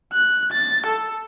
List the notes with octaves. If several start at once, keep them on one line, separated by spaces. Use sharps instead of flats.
F#6
A6
A4